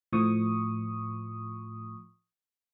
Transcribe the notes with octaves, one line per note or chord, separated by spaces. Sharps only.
A2 F3 C#6 D#6